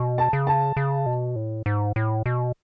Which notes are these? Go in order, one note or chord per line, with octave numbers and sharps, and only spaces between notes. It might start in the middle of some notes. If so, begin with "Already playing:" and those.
Already playing: B2
A5
C#3
A5
C#3
B2
A2
G#2
A2
B2